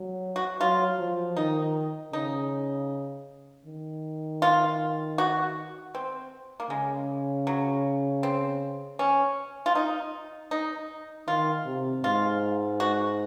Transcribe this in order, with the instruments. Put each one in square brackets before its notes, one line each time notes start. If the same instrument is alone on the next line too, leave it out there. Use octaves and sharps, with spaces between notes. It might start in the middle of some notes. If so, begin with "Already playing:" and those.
Already playing: [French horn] F#3
[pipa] F#4
[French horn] F#3 [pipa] F4
[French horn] F3
[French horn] D#3 [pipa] D#4
[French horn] C#3 [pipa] D#4
[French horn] D#3
[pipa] F4
F#4
C4
A#3
[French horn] C#3 [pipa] G#3
[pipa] F#3
C4
C#4
F4
D#4
D#4
[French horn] D#3 [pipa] F4
[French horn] C3
[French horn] G#2 [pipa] F4
[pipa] F#4